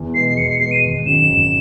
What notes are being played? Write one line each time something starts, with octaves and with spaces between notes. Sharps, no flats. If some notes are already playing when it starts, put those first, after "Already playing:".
Already playing: E2
B2 G#3 B3 C7
C7
E2 C#7
C7
B2 G#3 B3 C7
D#7
G#1
F#2 D#3 F#3 E7
G#1